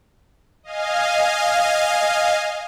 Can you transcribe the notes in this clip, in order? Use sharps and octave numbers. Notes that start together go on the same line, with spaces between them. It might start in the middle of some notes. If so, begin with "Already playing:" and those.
D#5 F5 G#5